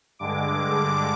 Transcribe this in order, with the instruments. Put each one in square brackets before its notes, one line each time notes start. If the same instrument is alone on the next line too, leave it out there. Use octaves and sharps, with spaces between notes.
[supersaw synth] G2 D3 G#3 D6